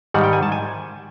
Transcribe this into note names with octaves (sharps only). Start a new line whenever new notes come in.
G#2 D#3 G3 F#5
G5
G#5
A5
G#5